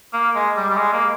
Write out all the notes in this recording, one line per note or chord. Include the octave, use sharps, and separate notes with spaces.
A#3
G#3
G3
G3
G#3
A#3